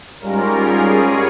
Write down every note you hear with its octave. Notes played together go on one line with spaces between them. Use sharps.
G#2 G3 C#4 F4 A#4
G#4
C#5